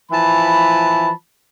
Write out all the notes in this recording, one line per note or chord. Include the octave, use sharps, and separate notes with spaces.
E3 F3 A5 B5